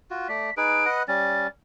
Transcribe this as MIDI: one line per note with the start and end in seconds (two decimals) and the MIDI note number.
0.10 0.28 65
0.10 0.28 66
0.29 0.50 57
0.29 0.50 74
0.29 0.55 95
0.57 0.86 63
0.57 0.86 68
0.57 0.86 71
0.57 0.88 98
0.86 1.03 71
0.86 1.03 75
0.86 1.03 78
1.08 1.47 55
1.08 1.47 61
1.08 1.47 93